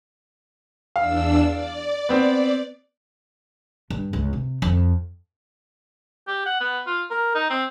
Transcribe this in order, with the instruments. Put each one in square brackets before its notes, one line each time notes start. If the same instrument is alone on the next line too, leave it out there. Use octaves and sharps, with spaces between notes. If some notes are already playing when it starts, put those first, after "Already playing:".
[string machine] E2 D4 E6 [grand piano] F5
[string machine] D5
[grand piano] B3 C4
[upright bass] G2
C#2
C3
F2
[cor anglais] G4
F#5
B3
F4
A#4
D#4
C4